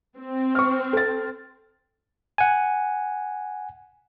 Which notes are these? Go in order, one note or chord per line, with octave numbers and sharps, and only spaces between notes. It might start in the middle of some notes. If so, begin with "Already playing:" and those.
C4
C#6 F6
A4 A6
F#5 G#5